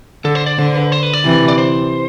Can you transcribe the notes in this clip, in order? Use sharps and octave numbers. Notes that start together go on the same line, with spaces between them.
D3 A4
C5
D5
D3 C5
B4
C5
B4
D5
C3 E3
D5
C5